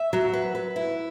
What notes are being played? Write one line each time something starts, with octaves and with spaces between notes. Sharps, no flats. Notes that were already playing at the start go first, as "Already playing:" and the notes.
Already playing: E5
F#3
B4
B4
E4